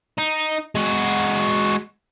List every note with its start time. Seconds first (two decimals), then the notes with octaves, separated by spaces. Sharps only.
0.18 D#4
0.75 G#3 F#4